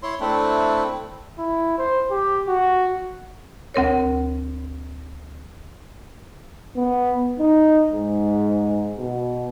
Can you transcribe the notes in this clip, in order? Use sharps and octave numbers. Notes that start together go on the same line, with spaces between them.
E4 C#5 C6
A3 C4 D4 E4
E4
C5
G4
F#4
D2 C4 A#4 C#5
B3
D#4
G#2
B2